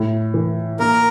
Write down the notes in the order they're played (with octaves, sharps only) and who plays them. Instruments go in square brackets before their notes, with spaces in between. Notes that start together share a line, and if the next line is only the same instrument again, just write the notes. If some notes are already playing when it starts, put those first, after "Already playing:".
Already playing: [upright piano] A2
E3
[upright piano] A#3 [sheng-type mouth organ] A#4